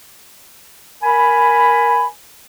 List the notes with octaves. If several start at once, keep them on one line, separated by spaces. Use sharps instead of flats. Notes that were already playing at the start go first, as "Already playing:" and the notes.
A#4 G#5 B5